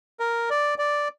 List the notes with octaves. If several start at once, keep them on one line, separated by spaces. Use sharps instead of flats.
A#4
D5
D5